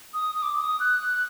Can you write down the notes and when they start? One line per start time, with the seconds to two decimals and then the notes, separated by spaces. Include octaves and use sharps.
0.14 D#6
0.35 D#6
0.42 D6
0.61 D#6
0.80 F#6